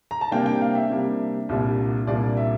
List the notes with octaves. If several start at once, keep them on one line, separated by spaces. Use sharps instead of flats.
A#5
A5
C3 G3 A#3 D4 G5
G5
F5
E5
C3 G3 A#3 D4
C2 A#2 G3 A#3 D4
C2 A#2 G3 A#3 D4 D5
E5